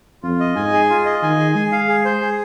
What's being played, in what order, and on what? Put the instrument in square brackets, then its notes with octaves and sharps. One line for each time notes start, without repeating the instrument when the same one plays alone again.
[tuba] F2 [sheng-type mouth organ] F4
[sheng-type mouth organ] D#5
[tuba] G#2 [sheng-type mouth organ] G#5
[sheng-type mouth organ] G#4
F4
D#5
[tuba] D#3 [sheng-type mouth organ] G#5
[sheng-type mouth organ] G#4
[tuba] G#3 [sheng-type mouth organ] G#4
[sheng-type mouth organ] F5
G#4
C5
G#4